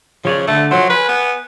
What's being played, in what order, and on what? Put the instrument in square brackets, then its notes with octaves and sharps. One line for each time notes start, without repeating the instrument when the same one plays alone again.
[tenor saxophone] C#3 [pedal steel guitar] F3 C#5 D5
[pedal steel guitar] D3 [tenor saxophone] A3
[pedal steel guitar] F3 C5 [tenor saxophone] F#3
[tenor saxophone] B4 [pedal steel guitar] G#5
[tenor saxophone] B3